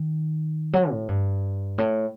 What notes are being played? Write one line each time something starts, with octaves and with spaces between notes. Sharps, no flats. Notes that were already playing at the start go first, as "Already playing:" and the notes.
Already playing: D#3
F#3
A2
G2
A2